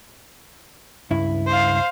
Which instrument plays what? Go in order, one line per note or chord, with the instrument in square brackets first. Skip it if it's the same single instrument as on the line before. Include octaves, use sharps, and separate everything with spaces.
[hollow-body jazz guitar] C#2 G2 E4
[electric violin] C5 F5